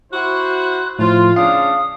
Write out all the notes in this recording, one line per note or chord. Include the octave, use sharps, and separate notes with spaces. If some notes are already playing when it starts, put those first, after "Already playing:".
E4 F#4 C5 F#6
A2 F3 F4
C#3 D4 F5 D#6